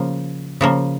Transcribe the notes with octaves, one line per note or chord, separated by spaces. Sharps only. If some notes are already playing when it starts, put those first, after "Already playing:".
Already playing: C#3 F3 A#3
C#3 F3 A#3